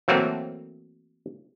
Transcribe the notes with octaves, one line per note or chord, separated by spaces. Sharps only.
E3 F#3 A3 A#3 C4